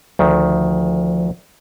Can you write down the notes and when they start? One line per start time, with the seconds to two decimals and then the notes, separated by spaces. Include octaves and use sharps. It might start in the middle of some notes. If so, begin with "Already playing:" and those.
0.19 D2 D#3 F3